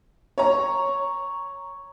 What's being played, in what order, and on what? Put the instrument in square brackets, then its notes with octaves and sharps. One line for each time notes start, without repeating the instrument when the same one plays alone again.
[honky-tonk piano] C#5 A#5